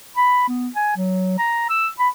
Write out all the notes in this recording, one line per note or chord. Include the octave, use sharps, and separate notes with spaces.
B5
B3
G#5
F#3
A#5
E6
B5